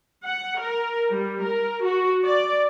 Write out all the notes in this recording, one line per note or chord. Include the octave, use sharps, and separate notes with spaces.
F#5
A#4
G3
A#4
F#4
D5